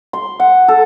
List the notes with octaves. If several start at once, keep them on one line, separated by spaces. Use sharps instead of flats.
C6
F#5
A4